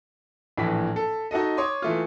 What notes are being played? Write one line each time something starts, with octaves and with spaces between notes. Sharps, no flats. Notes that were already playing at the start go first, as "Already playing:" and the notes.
A#1 A2 E3 B6
A4
D#4 F#4 A4 D#5
C#5 C6 D6 D#6
E3 A3 F4